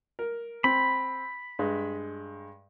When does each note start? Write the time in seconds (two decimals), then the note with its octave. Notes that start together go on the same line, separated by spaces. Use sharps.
0.19 A#4
0.64 C4 B5
1.59 G2 G#3